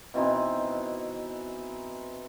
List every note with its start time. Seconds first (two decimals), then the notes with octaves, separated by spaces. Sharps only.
0.14 B2 E3 C4 D#4